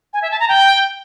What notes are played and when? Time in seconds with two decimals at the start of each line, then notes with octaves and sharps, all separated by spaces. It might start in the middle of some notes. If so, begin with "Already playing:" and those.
0.13 G#5
0.22 E5
0.31 A5
0.40 A#5
0.49 G5